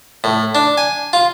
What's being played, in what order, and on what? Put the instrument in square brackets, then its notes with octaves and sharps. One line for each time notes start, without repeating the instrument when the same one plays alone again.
[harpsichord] A2
D4
G#5
F4